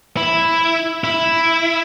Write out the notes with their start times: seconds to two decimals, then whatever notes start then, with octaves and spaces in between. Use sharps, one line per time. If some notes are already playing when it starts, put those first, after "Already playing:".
0.17 E4
1.04 E4